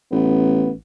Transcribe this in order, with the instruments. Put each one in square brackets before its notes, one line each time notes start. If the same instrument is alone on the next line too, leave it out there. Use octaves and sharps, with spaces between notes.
[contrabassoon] A1 [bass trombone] B3